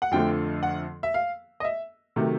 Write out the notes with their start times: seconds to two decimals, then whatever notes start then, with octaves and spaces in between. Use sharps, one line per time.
0.02 F#5
0.11 F2 D3 F3 A3 G5
0.63 F#5
1.03 E5
1.14 F5
1.60 D#5
1.65 E5
2.16 C3 D#3 F#3 A3